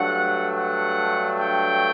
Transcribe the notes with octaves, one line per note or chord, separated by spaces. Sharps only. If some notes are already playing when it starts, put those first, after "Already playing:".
Already playing: G2 F#3 A3 D4 F#5
F#5
G5